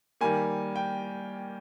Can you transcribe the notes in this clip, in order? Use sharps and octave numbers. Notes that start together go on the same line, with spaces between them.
D#3 G3 A#3 G#5
G5